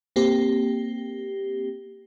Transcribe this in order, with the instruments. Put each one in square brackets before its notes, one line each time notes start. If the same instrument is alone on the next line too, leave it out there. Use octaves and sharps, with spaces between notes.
[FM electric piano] A#3 C4 G4